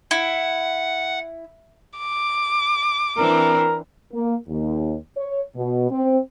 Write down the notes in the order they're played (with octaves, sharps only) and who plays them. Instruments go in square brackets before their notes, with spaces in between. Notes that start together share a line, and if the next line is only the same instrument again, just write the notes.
[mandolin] E4 [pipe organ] F#5
[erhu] D6
[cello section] E3 C4 D4 [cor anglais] A#4
[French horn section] A#3
D#2
C#5
B2
C4